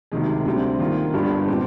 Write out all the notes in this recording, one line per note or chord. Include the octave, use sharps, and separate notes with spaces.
D2 C3 D#3 G#3
D2 D3 G3 C4
D#3 A#3 F4
G1 G2 D3 G3 D4
A#2 G#3 C4